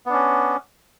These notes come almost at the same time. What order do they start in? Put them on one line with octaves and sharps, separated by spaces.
B3 D4 C#4